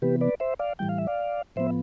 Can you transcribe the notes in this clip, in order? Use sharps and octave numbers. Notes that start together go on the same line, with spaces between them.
C3 E3 B3 G4 B4
B4 D5
C5 E5
D5 F5
A2 E3 G3 G5
F5
E5
D5 F5
A2 F3 B3 C5 E5